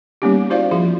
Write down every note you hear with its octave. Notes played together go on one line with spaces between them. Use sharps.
G3 A#3 B3 C#4 D#4 G4
E4 F#4 C5 D5 F5
F3 F4 G#4 E5